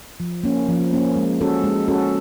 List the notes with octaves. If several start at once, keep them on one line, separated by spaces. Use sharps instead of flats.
F3
A#3 C#4
F3
A#3 C#4
G#3
C#4 F#4 A4
G#3
C#4 F#4 A4